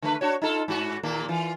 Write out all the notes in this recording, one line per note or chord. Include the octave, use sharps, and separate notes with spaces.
D3 A3 B4
D4 F#4 C#5
D#4 F4 A4
G#2 F#4
D#2 A#2 A#3
E3 F4